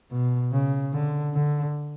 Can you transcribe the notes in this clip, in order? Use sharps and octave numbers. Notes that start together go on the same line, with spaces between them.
B2
C#3
D3
D3